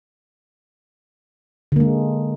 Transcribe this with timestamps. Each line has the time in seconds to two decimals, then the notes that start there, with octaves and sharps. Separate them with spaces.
1.72 D3
1.76 A#3
1.80 G#3